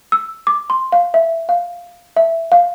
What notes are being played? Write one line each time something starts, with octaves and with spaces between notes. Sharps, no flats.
E6
D6
C6
F5
E5
F5
E5
F5